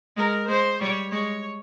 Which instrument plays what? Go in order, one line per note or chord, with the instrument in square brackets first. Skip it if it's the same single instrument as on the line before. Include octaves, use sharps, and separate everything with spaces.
[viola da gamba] G#3 [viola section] A#4
[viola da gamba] G#3 [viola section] C5
[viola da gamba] G3 [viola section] C#5
[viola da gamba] G#3 [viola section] C#5